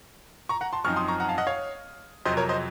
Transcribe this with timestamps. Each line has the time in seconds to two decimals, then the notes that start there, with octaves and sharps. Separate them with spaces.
0.49 A#5 C#6
0.61 F#5 A#5
0.73 A5 C6
0.84 F#2 F3 C4 D#4 C#6 F6
0.96 C6 D#6
1.08 A#5 C#6
1.20 F#5 A#5
1.29 F5 A5
1.38 D#5 F#5
1.47 C#5 F5
2.25 F2 C3 F#3 C5 D#5
2.37 A#4 C#5
2.49 C5 D#5